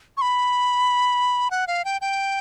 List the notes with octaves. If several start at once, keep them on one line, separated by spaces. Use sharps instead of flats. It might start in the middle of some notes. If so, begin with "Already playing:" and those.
C#6
B5
F#5
F5
G5
G5